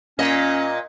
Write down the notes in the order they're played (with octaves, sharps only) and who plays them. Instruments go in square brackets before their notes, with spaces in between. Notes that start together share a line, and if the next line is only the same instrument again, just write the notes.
[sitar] A#2 D#5 [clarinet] C#4